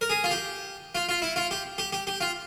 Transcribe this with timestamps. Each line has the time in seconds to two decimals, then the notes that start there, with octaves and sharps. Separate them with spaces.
0.01 A#4
0.10 G#4
0.24 F4
0.31 G4
0.95 F4
1.09 F4
1.22 E4
1.36 F4
1.51 G4
1.78 G4
1.93 G4
2.07 G4
2.21 F4